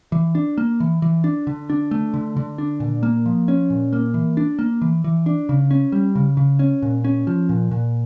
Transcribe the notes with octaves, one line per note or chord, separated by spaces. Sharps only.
E3
D4
A#3
E3
E3
D4
D3
D4
A3
D3
D3
D4
A#2
A#3
F3
C#4
A#2
A#3
E3
D4
A#3
E3
E3
D4
C#3
C#4
G3
C#3
C#3
C#4
A#2
C#4
F3
A#2
A#2